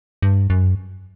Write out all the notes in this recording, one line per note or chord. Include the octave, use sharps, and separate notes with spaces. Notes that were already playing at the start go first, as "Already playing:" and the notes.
G2
F#2